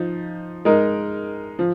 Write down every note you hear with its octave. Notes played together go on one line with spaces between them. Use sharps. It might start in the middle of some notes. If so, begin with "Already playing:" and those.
Already playing: F3 D#4
G#3 D#4 A#4
F3